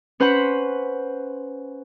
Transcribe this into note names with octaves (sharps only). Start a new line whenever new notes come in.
C#4 B4 C5 F#5 B5